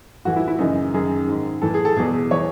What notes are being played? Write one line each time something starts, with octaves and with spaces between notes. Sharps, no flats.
A2 E3 F#4
E4
E4
F#2 C#3 E3 D#4
F#2 D#3 G#4
G#2 D#3
A2 E3 A4
G#4
A4
E2 B2 G#4
E3 C#5